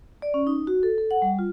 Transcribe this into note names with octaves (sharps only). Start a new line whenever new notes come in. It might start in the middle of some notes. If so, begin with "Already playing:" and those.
D5
C#4
D#4
F#4
A4
A4
F#5
G3
F4